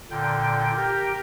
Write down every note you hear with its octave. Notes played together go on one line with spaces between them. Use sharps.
A#2 D3 G5
G4 A#4 G5